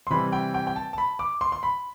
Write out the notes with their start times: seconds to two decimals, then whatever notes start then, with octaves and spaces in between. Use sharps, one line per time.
0.07 C6
0.10 C3 E3 G3 B5
0.32 G5
0.54 G5
0.67 G5
0.76 A5
0.93 A5
0.98 B5
1.19 D6
1.41 C6
1.52 C6
1.63 B5